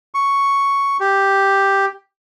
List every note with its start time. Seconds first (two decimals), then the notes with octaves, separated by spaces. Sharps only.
0.14 C#6
1.00 G4